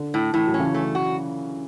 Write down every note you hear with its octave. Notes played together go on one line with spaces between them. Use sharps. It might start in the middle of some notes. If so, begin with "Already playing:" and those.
Already playing: D3
A2
A2 E3
F#3
C#4
C#3 E3
A3
F#4